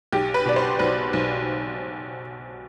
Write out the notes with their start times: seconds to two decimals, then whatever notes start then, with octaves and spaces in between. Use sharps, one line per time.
0.12 B1 G4
0.34 B4
0.45 B2 D5
0.56 C5
0.79 B1 B4
1.13 B1